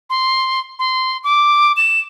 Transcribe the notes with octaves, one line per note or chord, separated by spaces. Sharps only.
C6
C6
D6
E7